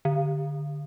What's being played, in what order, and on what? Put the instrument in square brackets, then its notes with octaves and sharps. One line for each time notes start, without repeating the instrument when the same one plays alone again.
[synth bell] D3